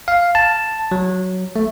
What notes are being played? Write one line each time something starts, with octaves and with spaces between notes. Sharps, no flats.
F5
A5
F#3
A3